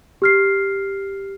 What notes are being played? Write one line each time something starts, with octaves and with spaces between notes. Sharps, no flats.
G4 F6 C7